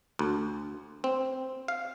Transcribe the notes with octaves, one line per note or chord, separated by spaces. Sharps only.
D2
C4
F5